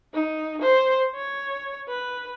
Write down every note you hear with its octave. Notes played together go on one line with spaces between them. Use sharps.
D#4
C5
C#5
B4